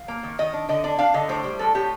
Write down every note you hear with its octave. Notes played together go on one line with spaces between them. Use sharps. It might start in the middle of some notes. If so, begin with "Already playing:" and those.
Already playing: F5
A#3
D#3
D#3 D#5
D4
D3 D#5
D4 D5
D4 F5
D3 D#5
A2 C5
G3
A2 A4
A2 G4